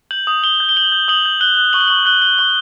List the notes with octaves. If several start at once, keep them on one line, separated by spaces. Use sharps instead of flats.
G6 F#7
D#6
D#6 G7
G6
G7
G6 F#7
G6
D#6 F#7
G6
F#6 G7
F#6
C#6 F#7
G7
C#6 F#7
F#6 G7
F#6 G7
C#6 G7